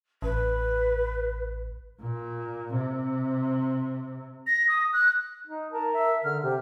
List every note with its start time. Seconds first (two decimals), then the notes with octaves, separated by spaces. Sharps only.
0.22 A1 B4
2.01 A#2
2.76 C3
4.47 A#6
4.69 D#6
4.93 F#6
5.47 D#4
5.73 A#4 A5
5.94 E5
6.24 D3 F6
6.43 C3 G4